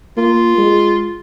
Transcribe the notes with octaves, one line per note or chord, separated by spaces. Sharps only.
A#3 F4
G#3